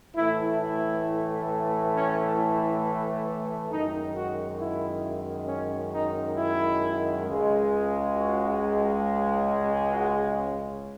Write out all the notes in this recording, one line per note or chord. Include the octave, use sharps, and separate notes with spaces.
A2 E3 A3 E4
E4
C#4
E4
F#2 D#3 G#3 D#4
F#4
E4
C#4
D#4
E4
C#2 C#3 G#3
F#4
F#4
C#4